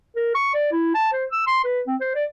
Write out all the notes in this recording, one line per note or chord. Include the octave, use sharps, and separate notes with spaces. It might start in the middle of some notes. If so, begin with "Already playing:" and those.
A#4
C#6
D5
E4
A5
C5
E6
C6
B4
C4
C5
D5